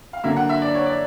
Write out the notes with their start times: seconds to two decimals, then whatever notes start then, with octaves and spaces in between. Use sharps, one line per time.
0.13 F5
0.24 D3 F#3 A#3 E5
0.36 F#5
0.49 E5
0.62 D5
0.74 C#5
0.86 D5